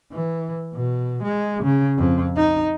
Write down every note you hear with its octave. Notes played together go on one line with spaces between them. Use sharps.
E3
B2
G#3
C#3
F2
D#4